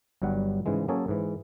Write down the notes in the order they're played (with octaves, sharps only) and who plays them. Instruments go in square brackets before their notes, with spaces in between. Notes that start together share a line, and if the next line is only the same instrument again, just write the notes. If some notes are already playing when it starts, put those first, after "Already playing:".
[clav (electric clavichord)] G1 G2 F#3 G3 F#5
G#2 C#3 E3 G#3
F#3 A#3 C#4 G#4 A4 C#5
G#2 E3